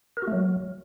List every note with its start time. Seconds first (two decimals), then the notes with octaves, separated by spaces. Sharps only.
0.17 A#4
0.22 F#4
0.27 A3
0.33 F#3